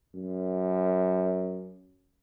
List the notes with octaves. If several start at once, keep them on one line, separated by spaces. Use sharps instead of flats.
F#2